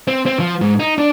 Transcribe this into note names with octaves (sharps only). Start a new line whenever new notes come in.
C4
C4
F3
G#2
D#4
D4